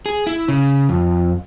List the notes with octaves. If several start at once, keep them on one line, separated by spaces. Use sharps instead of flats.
G#4
E4
C#3
F2